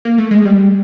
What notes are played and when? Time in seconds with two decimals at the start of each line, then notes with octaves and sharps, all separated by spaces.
0.05 A#3
0.18 A3
0.31 G#3
0.45 G3